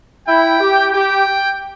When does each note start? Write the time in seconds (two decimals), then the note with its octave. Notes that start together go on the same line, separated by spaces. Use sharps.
0.27 E4 G5
0.61 G4
0.93 G4 G5